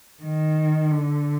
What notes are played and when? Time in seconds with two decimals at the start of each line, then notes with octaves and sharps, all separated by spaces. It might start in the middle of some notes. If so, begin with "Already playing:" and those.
0.23 D#3
0.91 D3